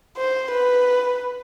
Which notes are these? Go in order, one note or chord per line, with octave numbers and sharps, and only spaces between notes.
C5
B4